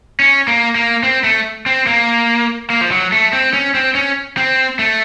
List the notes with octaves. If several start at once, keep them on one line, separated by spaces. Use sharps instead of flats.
C#4
A#3
A#3
C4
A3
C4
A#3
A#3
F3
F#3
A3
C4
C#4
C4
C#4
C4
A3